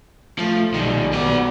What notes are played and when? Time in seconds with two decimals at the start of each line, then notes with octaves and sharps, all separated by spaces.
0.39 F3 A3
0.74 B1 D#3 G3
1.13 B3 F#4 D5